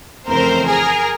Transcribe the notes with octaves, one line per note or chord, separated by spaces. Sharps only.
F2 C#3 E3 A3 C4 A#4 C5
G#4 A#4